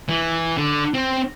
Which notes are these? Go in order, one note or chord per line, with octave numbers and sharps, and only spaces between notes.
E3
D3
C4